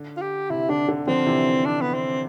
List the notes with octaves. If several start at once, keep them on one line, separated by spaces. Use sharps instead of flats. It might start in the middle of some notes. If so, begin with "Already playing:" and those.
Already playing: D3
F4
G4
C3 E4
D3 D4
D3
D3 F3 C4
C3 E3
D4
B3
C4